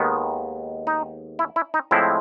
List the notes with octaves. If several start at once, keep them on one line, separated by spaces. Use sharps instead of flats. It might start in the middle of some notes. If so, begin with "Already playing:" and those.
Already playing: D#2 D#3 G#3 B3
D#4
E4
E4
D#4
A2 F3 G#3 C4 E4